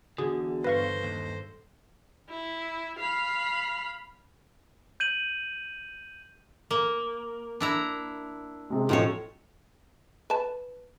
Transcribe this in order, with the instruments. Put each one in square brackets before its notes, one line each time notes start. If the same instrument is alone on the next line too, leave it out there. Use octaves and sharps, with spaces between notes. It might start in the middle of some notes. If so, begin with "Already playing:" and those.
[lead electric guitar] E2 D3 [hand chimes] F#4 [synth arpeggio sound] G#4
[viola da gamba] G2 A4 C5 [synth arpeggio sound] B4 F5 C#6 [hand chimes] A#6
[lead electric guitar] D#2
[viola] E4
F5 B5
[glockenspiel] G6 D#7 F#7
[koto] A#3
D4 E4 A#5
[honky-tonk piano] C3 G#3
[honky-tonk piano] B1 F#2 F4 [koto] A2 F3 C#5
[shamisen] B4 A5